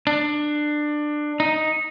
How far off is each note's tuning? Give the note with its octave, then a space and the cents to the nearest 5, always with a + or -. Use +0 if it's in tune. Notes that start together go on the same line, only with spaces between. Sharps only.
D4 +20
D#4 +5